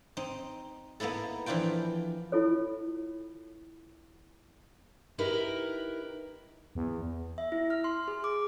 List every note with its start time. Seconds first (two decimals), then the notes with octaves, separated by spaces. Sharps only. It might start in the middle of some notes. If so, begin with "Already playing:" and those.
0.17 C4 D#4
1.00 A#3 B3 D#4 E4 A4
1.46 E3 F3 D4 E4 F4 G5
2.32 E4 F4 A4 C#5
5.18 D#4 E4 G4 A#4 B4
6.75 E2
7.38 E5
7.52 E4
7.70 F6
7.84 C6
8.08 G#4
8.24 D6